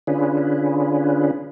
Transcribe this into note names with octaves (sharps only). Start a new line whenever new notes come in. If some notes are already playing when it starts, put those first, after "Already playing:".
D3 C#4 D4 F4 G#4 B4